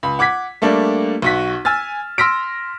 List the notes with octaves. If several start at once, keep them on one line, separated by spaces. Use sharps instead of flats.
C#2 B5
F#5 D6 G#6 B6
G3 A3 A#3 D4
B1 F#4 B6
G#5 E6 F6 A6
C6 E6 F6 A#6 B6 D7